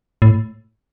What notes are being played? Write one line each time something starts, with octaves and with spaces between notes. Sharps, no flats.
A2